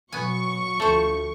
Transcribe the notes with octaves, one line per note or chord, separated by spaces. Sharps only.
B2 F#3 B3 G#5 C#6
D2 F3 A3 C5